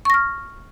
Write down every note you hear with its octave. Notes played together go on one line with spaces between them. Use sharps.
C#6 F6 A#6